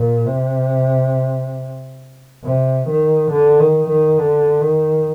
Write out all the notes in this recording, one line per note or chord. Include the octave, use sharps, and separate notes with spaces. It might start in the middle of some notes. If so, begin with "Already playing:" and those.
Already playing: A#2
C3
C3
D#3
D3
D#3
D#3
D3
D#3